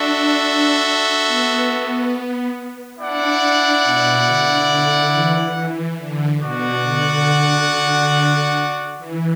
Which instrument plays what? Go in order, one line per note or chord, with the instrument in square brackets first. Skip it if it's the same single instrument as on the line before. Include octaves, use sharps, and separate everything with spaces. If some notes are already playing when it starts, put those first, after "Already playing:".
Already playing: [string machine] D4 [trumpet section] F#4 A4 E5
[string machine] B3
[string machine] D4 [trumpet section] E4 D5 F#5
[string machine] D4
B2
D3
D3
E3
E3
D3
[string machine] B2 [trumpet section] F#4 D5 F#5
[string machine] D3
E3